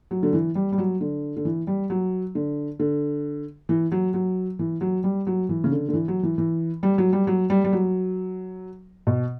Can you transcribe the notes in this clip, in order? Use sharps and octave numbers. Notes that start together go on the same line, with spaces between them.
F#3
D3
E3
G3
G3
F#3
D3
D3
E3
G3
F#3
D3
D3
E3
F#3
F#3
E3
F#3
G3
F#3
E3
C#3
D3
D3
E3
F#3
E3
E3
G3
F#3
G3
F#3
G3
G3
F#3
B2